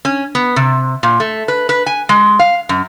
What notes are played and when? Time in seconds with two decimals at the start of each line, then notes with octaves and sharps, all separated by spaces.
0.05 C#4
0.35 B3
0.56 C3
1.03 A#2
1.20 A3
1.48 B4
1.69 B4
1.86 G#5
2.09 G#3
2.39 F5
2.69 F#2